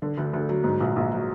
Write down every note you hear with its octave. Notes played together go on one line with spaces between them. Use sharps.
D3
D2
D2
F#3
G#2
A#1
A#1
F#3